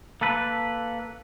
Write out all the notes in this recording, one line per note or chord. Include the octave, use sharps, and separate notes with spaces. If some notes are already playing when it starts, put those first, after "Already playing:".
A#3 A4 B4